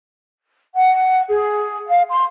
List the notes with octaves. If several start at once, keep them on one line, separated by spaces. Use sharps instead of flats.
F#5
G#4
F5
C6